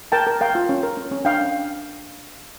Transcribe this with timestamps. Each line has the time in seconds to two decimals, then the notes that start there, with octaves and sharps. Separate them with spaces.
0.12 A#4 G5 A5
0.27 A#4
0.41 A#4 F5 G5
0.55 F4
0.69 C#4
0.83 A#4
0.97 C#4
1.11 C#4
1.25 D4 F5 G5